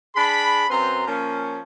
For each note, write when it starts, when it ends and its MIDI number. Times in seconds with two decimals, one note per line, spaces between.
0.16 0.64 62
0.16 0.64 68
0.16 0.64 83
0.69 1.03 42
0.69 1.03 60
0.69 1.03 71
0.69 1.03 82
0.69 1.03 84
1.08 1.60 53
1.08 1.60 58
1.08 1.60 61